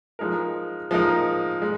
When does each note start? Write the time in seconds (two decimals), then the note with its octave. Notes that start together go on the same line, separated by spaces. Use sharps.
0.19 F3 G#3 D#4 A#4
0.91 F3 G#3 D#4 A#4
1.62 G#3